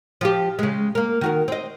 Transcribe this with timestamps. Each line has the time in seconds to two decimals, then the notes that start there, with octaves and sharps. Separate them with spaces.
0.21 F3 F4 G4
0.59 C#3 G#3
0.95 A#3 A#4
1.21 D#3 F#4 A#4
1.48 C4 D#5